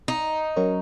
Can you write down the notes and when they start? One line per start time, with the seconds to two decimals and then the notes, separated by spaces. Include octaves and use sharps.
0.08 D#4
0.56 F#3 C#4 F#4 A#4 C#5